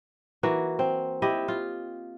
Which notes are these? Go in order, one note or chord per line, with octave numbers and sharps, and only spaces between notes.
E3 A#3 F#4
C4
E4 G4 D#5
F4